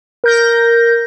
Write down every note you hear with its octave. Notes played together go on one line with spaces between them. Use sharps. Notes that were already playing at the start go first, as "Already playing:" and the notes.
A#4 G6 A#6